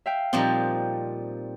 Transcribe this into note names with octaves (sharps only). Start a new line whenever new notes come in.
E5 F5 G5
A#2 F3 G3 C4 D#4